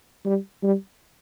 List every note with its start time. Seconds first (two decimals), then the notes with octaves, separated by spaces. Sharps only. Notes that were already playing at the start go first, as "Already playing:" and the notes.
0.26 G3
0.63 G3